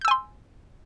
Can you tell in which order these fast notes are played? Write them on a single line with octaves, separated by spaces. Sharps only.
G6 E6 G#5 C6